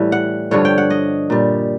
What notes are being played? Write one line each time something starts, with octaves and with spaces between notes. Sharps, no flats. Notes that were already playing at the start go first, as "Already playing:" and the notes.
Already playing: A2 E3 G3
F#5
G2 D3 F3 C#5
G5
F#5
D#5
A#2 G3